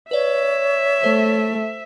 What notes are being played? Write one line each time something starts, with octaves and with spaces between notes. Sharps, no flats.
B4 C#5 D5 E5
A3 C5